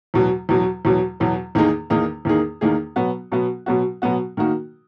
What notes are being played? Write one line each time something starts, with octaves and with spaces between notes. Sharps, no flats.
E2 B2 F#3
E2 B2 F#3
E2 B2 F#3
E2 B2 F#3
E2 D#3 A#3 D#4 G#4
E2 D#3 A#3 D#4 G#4
E2 D#3 A#3 D#4 G#4
E2 D#3 A#3 D#4 G#4
B2 F#3 B3 F#4
B2 F#3 B3 F#4
B2 F#3 B3 F#4
B2 F#3 B3 F#4
D#3 A#3 D#4 F#4